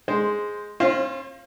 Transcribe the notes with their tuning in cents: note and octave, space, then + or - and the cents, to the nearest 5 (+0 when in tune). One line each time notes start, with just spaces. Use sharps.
G#3 +0 C5 +0
C#4 -45 F4 -10 C5 +35